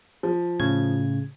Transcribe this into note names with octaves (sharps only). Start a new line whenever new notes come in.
F3
A2 C#3 G#6